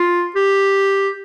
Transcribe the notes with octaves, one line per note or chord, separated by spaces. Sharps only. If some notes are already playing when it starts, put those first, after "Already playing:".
Already playing: F4
G4